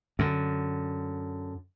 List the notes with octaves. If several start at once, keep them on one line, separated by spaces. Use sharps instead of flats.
F#2 D3